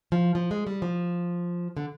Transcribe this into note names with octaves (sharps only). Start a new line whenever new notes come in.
F3
F3
G#3
G3
F3
D3